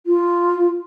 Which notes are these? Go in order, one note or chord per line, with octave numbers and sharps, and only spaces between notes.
F4